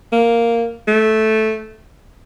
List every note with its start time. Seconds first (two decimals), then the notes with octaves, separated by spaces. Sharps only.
0.13 A#3
0.88 A3